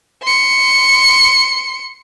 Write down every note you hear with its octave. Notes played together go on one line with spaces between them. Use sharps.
C6 C#7